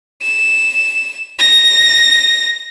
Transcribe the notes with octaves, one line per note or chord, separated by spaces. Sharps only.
E7
A#6